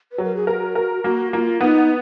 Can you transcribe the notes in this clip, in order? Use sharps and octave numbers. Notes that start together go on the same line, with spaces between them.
B4
F#3
A#4
G#4
F#4 G#4 A#4
A#4
A#3 F#4
A#3 F4
B3 D#4